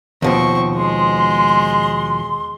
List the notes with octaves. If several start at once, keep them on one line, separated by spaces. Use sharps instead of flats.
D#2 B2 F3 C4 C#6
G#3 C6